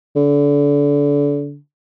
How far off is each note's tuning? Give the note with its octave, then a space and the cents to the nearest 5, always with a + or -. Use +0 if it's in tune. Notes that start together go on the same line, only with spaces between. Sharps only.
D3 -30